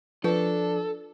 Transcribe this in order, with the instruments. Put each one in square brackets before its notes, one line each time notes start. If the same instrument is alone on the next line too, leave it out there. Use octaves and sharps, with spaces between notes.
[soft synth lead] F3 [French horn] D4 [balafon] F4 B4 [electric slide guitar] A4